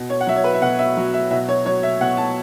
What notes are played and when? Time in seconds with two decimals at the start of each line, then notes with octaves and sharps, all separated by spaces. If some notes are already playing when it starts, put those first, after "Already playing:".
Already playing: B2
0.10 C#5
0.21 F#5
0.27 F#3 E5
0.36 C#5
0.44 B4
0.54 E5
0.62 B2 F#5
0.79 E5
0.97 F#3
1.14 E5
1.31 B2 E5
1.49 C#5
1.66 F#3 C#5
1.83 E5
2.01 B2 F#5
2.17 A5